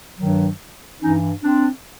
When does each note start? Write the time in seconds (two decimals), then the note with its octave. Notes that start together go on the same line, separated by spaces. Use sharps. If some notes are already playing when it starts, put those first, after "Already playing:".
0.19 G2 D#3 F#3
1.02 G2 E3 C#4 D#4
1.43 C4 D4